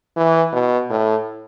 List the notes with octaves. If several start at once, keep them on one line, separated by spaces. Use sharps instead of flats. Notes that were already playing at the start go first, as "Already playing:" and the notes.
E3
B2
A2